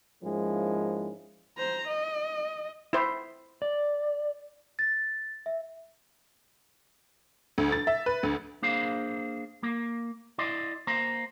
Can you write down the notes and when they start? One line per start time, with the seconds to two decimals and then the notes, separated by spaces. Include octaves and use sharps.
0.23 G#2 F3 G#3 A#3 C#4 E4
1.57 C5 A#5
1.87 D#5
2.93 E4 C5
3.62 D5
4.79 A6
5.46 E5
7.58 D2
7.72 A6
7.87 E5
8.06 B4
8.23 D2
8.62 A#3 D4 G#4 C5 F5
9.63 A#3
10.38 E4 D5 D#5 C6
10.87 A#3 C5 A#5